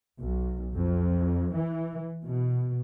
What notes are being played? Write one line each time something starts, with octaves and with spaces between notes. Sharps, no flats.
B1
F2
E3
B2